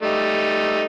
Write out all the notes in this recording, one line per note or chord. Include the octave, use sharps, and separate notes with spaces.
G3 A3 D#4